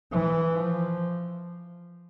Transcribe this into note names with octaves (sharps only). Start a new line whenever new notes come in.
E3
F3